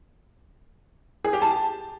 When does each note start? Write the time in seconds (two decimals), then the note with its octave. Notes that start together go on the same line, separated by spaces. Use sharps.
1.25 G#4
1.33 G4
1.42 A5